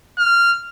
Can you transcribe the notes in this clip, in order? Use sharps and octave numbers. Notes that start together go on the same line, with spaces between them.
F6